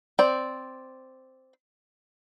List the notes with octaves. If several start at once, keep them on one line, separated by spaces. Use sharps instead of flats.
C4 D5